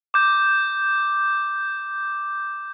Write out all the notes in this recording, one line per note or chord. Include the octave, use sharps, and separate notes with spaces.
D6 G6